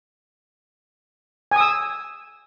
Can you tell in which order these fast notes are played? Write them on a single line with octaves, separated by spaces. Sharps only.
G#5 D#6 E6